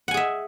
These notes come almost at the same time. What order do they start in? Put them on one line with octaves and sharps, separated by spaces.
F#5 G#5 G#4 E5